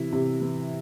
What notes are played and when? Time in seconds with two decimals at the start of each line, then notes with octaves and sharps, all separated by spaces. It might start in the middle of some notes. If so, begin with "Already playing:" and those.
Already playing: C3 E3 E4
0.13 C3
0.42 E3